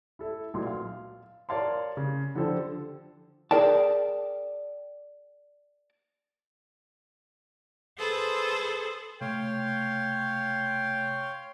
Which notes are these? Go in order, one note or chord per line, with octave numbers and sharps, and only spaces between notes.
E4 A4 E5
B1 A#2 C6
F5
A#4 C#5 D5 F5 A5 C6
C#3
D3 F3 G4 A4 C5
G#4 A#4 D5 G5 A5
G#4 A4 B4 C5
C3 A3 C#5 F5 G5 C6